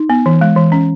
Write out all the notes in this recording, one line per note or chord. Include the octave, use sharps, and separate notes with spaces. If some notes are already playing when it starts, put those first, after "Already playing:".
Already playing: D#4
B3
E3
G#3
E3
C#4